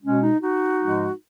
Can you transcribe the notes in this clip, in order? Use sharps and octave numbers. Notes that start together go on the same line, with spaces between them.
B2 G#3 C#4
D#4
D#4 F#4
G#2 F3 G#3